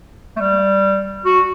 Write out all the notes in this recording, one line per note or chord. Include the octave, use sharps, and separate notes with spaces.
A3
G3
F#4